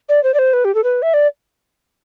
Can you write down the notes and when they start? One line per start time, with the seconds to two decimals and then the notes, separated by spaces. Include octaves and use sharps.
0.09 D5
0.23 C5
0.34 D5
0.39 C5
0.53 B4
0.65 G4
0.75 A4
0.84 B4
1.02 E5
1.14 D5